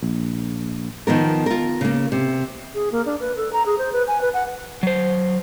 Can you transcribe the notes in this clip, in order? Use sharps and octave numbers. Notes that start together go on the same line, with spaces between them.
A#1
D#3 F3 B3 A#4
F4 A#4
C#3 A#3
C3
G#4
A#3
D4
B4
A4
A#5
G#4
C5
B4
G#5
B4
F#5
F#3 C5